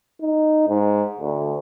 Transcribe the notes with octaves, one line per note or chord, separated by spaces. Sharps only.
D#4
G#2
D2